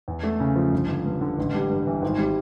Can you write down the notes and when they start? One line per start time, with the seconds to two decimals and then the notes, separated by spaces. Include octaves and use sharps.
0.08 E2
0.23 A3
0.40 C#3
0.56 F3
0.73 G1
0.88 G1
1.05 G2
1.21 D3
1.38 A1
1.54 G3
1.69 G2
1.87 E3
2.02 G#1
2.18 G3